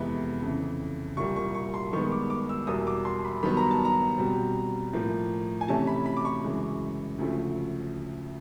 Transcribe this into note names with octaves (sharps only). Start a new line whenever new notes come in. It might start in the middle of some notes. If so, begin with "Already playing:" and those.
Already playing: F2 C3 E3 G#3 B3
F2 C#3 E3
C2 A#2 G3 C#6
C#6
C#6
C6
G2 D#3 G#3 B3 C#6
D6
D6
E6
E2 B2 G3 A#3 D#6
D6
C6
B5
G2 D#3 F#3 B3 B5
A#5
A5
A#5
B2 G3 C4
A2 F3 A#3
G#5
C3 E3 A3 C#4 A5
B5
B5
D6
C#6
F#2 C#3 E3 G#3
D2 C#3 F3 A3